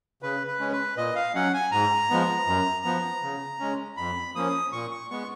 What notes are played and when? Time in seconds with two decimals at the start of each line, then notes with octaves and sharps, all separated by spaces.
0.23 C#3 B4
0.47 B4
0.60 G#3 C#4
0.72 B4
0.97 A#2 D#5
1.16 F5
1.35 F#3 C#4 F#5
1.54 G#5
1.72 G#2 A#5
2.10 F3 G#3 B3
2.47 F#2
2.85 F3 B3
3.23 C#3
3.60 G#3 C#4
3.97 F2 B5
4.35 F3 A#3 C#4 D#6
4.72 A#2 C#6
4.91 C#6
5.10 G#3 B3 C#6